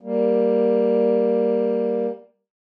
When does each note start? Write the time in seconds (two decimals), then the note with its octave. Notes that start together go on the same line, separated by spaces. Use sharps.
0.01 G3 A#3